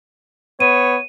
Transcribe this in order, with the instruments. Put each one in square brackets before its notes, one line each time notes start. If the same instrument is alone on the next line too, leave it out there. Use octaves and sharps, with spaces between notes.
[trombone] B3 [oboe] C#5 [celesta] D#7